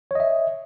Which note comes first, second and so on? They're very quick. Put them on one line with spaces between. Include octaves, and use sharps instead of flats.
C#5 D#5 E5